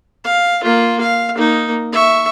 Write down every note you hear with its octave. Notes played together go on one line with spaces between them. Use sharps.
F5
A#3 F4
F5
A#3 D#4
E5 C#6